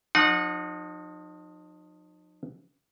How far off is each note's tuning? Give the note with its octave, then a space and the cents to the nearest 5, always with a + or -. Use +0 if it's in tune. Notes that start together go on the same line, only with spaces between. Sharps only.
F3 +30 D#4 -30 F#5 -20